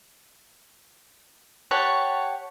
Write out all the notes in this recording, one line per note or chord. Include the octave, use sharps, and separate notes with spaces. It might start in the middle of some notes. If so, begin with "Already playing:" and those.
G4 C#5 F#5 A5